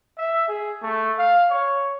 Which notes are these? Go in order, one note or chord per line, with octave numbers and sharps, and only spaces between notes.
E5
G#4
A3
F5
C#5